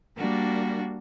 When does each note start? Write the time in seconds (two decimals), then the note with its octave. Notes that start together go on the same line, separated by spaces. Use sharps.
0.18 G3 A#3 D4 F#4